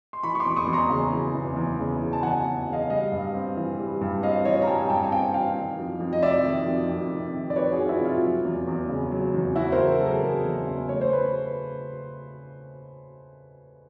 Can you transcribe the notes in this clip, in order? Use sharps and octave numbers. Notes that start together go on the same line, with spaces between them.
C6
E3 B5 C#6
C#6
C6 D6
E2
C#6 D#6
E2
A#5 C6
C#3
E3
E2
E2
C#3
E3
A5
E2 F#5 G#5
E2
C#3
D#5 F5
G3 D#5 F5
G2
C4
E3
G3
G2
C4 D#5 F5
E3 C#5 D#5
A#5
G3 G5 A5
G#5
G2 G5 A5
G#5
C4 F5 G5
E3 F5 G5
D#3
F2
F2
D#5
C3 D5 E5
D#3
F2
F2
C3
D#3
D5
F2 B4 C#5
F#4 G#4
F2
F4
E4 F#4
C3 F4
F#3
E2
E2
C#3
F#3
E2
E2 E4 F#4
A#4 C5
C#3
F#3 A4
G#4 A#4
E2
E2
C#3
A3 C#5
C5
B4